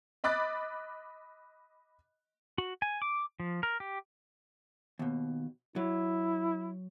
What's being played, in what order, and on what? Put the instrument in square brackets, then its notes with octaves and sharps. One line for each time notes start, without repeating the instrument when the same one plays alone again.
[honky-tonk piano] D#5 B5 D6 F#6 A6
[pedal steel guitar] F#4
G#5
D6
F3
A#4
G4
[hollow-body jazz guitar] D#2 B2
[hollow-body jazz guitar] F#3 [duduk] E4